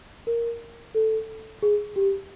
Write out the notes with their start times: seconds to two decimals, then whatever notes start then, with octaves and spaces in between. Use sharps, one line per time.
0.27 A#4
0.95 A4
1.62 G#4
1.96 G4